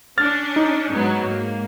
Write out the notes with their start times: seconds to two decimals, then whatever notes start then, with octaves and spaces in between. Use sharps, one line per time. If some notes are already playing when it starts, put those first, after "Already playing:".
0.18 C#4 D4 F6 A6
0.56 D#4
0.90 G#2 F#3 B3
1.22 G#2 A#3